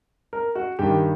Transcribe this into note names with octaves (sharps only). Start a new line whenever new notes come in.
A#4
F#4
G2 D#3 G4